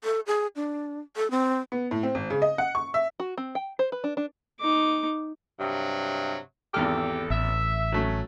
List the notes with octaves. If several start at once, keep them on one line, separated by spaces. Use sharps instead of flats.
A4
G#4
D4
A4
C4
B3
A2
C4
G#1
C#3
D#5
F#5
C#6
E5
F#4
C4
G5
C5
B4
D4
D4
D#4 D6
G2 C3 F#3
G#1 E2 G4 A4 F6
A1 E5
F#3 A3 C#4